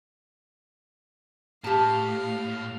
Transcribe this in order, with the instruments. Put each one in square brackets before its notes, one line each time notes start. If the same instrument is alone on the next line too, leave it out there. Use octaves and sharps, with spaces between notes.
[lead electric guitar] A2 [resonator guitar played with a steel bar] G4 A5 [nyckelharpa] F5